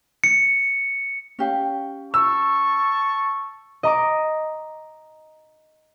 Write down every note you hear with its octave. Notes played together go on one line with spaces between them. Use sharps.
C#7
C#4 G4 F5
A5 C#6 E6
D#5 A#5 D6